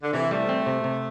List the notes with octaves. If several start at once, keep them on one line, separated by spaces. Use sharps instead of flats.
D3
C3 E3
G3 A3
C4
C3
C3